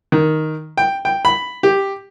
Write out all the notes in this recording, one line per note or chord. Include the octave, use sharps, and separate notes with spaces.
D#3
G5
G5
B5
G4